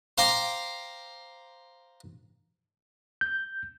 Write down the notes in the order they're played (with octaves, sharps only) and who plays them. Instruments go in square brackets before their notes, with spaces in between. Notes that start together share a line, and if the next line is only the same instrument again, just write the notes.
[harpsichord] C5 F5 G5 A#5 C6 D6
[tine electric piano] G6